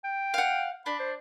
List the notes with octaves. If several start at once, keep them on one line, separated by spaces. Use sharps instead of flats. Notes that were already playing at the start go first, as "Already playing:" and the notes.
G5
F5 F#5
D4 B5
C5